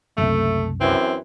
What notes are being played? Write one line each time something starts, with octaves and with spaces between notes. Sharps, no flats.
F#1 C2 A3
F#2 E3 C4